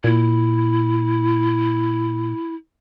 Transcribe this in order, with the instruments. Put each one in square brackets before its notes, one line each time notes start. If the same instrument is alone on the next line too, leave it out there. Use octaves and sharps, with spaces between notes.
[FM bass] A#2 [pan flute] E4